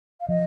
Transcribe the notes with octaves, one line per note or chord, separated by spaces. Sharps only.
F5
F3 D#5